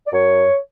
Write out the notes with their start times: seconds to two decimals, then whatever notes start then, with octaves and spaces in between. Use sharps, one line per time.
0.07 D5
0.13 F#2 C#5